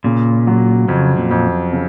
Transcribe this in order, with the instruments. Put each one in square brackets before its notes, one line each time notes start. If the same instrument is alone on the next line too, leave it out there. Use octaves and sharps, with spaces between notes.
[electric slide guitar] A#2 [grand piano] C#3
[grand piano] F#3
[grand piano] F2 [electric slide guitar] C#3
[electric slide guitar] A#2
[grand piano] F2
C#3